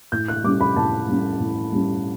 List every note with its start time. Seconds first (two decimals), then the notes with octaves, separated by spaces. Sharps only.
0.12 A2 G6
0.28 F#6
0.44 G3 C#4 D6
0.61 B5
0.76 A2 A5
1.08 G3 C#4
1.40 A2
1.72 G3 C#4